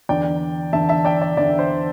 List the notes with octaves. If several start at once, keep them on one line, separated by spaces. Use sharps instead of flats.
E2 D3 D5 G5
E2 D3 E5 A5
E5 A5
D5 G5
D5
E2 D3 D5
C5